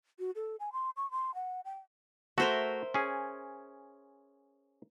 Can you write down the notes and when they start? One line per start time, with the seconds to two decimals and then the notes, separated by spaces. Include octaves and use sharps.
0.19 F#4
0.35 A4
0.60 G#5
0.72 C6
0.96 C#6
1.11 C6
1.34 F#5
1.65 G5
2.38 A3 F#4 A#4 C5 E5
2.94 C#4 G#4